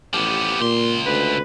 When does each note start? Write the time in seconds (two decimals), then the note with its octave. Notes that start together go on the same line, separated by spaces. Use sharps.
0.13 A1 F3 B3 G4
0.60 C#2 A#2 C6
1.06 D2 B4